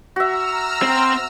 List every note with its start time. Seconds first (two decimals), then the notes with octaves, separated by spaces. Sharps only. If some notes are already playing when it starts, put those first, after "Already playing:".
0.16 F#4 E5 A#5 E6 F6
0.82 C4